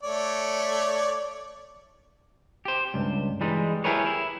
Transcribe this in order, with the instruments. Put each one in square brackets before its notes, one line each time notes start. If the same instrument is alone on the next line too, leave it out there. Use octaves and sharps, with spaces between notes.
[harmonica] A3 C#5 D5
[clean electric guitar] G4 C5
C#2 G2
E3 G3 G#3 D#4
E4 G4 G#4 A#4 B4 C#5
E4